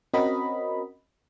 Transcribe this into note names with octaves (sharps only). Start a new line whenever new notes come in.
C4 C#4 F#4 A#4 D#5 B5